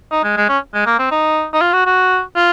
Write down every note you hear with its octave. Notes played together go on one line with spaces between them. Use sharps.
D#4
G#3
G#3
C#4
G#3
A#3
C4
D#4
D#4
F4
F#4
F#4
F4